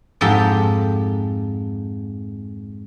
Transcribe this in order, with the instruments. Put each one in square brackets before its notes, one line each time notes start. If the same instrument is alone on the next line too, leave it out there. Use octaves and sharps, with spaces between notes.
[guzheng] F2 G#2 G4 A4